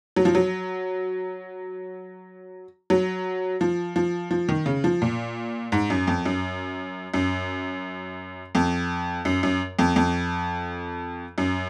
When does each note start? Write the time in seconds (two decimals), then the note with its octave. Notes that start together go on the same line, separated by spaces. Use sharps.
0.16 F#3
0.25 F3
0.35 F#3
2.90 F#3
3.61 F3
3.96 F3
4.31 F3
4.49 D#3
4.66 C#3
4.84 F3
5.02 A#2
5.72 G#2
5.90 F#2
6.07 F2
6.26 F#2
7.14 F#2
8.55 F2
9.25 F#2
9.43 F#2
9.79 F2
9.96 F2
11.38 F#2